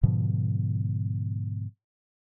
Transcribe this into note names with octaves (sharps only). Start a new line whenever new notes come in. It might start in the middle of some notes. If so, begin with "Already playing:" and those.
G#2 B2 D3 F3